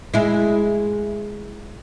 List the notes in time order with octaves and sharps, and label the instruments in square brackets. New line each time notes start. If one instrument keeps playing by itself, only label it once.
[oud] G#3 E4